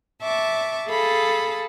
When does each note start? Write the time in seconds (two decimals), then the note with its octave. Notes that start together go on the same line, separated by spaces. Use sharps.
0.20 E5 A5 C#6 D6
0.87 G#4 A4 F5 A5 B5 D#6